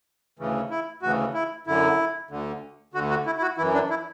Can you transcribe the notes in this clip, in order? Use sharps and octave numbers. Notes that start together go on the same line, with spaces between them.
D2 C#3 E3
E4
D2 C#3 E3 F#4
E4
F#2 D3 E4
D2 D3
D2 D3 F#4
F#4
E4
E4
F#4
F#2 E3 E4
D4
E4